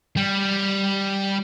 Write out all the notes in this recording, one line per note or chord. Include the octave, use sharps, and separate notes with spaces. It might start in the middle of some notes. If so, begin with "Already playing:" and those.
G3